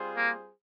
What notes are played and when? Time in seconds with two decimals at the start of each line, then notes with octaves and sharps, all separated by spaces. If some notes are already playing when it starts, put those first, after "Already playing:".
Already playing: G3 C4 F4 G#4 C5
0.17 A#3